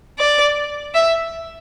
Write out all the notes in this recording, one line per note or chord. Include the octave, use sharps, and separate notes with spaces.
D5
E5